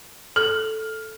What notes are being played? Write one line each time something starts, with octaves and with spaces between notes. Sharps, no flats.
A4 F6